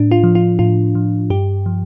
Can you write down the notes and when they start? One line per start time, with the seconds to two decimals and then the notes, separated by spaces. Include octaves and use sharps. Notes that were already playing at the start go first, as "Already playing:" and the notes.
Already playing: A2 D4
0.11 F4
0.24 F3
0.35 F4
0.59 A2 F4
0.95 F3
1.30 G2 G4
1.66 F3